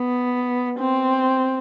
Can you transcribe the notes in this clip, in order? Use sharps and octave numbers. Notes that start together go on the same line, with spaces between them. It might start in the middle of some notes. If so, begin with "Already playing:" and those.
Already playing: B3
C4